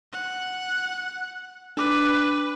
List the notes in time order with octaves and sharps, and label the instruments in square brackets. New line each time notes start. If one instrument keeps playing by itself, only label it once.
[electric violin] F#5
[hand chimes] D4 D6 [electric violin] B4